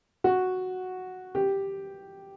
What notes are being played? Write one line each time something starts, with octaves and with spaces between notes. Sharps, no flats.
F#4
G4